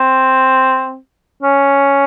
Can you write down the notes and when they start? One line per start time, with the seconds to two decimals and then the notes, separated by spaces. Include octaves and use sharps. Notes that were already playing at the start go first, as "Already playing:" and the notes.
Already playing: C4
1.43 C#4